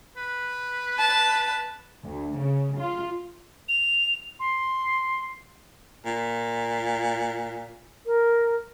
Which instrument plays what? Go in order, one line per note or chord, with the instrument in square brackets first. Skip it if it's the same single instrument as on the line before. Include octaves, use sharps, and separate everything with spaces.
[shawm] B4
[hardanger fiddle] A5
[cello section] D2
C#3
F4
[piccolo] F7
C6
[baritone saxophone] A#2
[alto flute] A#4